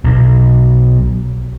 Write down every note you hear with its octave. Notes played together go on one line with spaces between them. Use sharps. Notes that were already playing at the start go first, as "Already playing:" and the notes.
B1